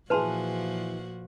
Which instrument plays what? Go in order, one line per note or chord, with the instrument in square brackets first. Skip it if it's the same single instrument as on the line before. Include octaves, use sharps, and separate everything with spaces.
[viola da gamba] A#2 F3 F#4 [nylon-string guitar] E3 G#4 [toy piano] B4 A5 C6